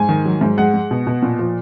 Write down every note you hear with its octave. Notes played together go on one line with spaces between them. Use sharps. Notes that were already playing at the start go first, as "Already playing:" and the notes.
Already playing: G#2 G#5
D#3
F#3
G#2
G#3 F#5
G#3
B2
B2
A#2
F3